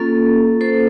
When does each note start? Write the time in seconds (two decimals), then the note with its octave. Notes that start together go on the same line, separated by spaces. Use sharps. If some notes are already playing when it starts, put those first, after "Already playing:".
Already playing: A#3 C#4 F4 A4
0.61 A4 C5